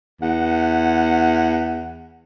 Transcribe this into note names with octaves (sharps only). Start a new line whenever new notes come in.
E2 F#5